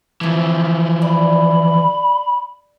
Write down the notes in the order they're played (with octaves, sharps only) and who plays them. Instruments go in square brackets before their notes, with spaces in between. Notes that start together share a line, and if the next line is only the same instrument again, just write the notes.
[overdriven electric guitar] E3 F3 [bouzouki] A3 C4
[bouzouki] D5 [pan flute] B5